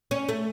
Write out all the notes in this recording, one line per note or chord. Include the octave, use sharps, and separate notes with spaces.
C#4
A3